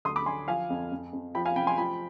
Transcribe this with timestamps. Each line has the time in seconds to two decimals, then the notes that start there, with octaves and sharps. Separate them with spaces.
0.05 D2 C6 D#6
0.16 B5 D6
0.26 D3 G#5 C6
0.48 F3 F5 G#5
0.70 F2
0.92 F2
1.13 F2
1.35 F3 G5 B5
1.45 F5 G#5
1.56 C3 G5 B5
1.67 G#5 C6
1.78 F3 G5 B5